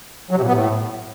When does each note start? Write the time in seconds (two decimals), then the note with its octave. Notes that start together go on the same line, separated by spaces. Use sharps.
0.31 F#3
0.36 C3
0.42 A#2
0.48 B3
0.53 A2